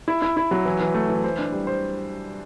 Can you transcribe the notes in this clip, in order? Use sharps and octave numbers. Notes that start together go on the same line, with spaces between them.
E4
E4
E4
F#3
E3
E3
A3
E3
C5
D4
G3
C5